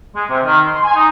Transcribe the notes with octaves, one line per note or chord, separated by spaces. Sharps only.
G#3
C3
D#3
C6
G#5
D#4